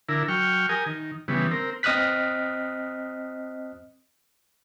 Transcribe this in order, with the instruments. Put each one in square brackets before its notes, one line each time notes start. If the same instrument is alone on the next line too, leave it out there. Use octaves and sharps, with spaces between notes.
[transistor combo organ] D3 E4 A#4
F#3 G5 C#6 F6
G4 A#4 G#5 D#6
D#3
C#3 E3 G3 B3
C4 A#4
[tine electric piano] C4 D#5 D#6 F6 F#6 B6